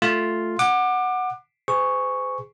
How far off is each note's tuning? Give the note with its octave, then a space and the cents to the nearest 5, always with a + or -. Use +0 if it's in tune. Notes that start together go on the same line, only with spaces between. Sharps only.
A3 +0 F4 +0
F#5 -5 D6 +25
G#4 +0 C5 -40 C#6 +0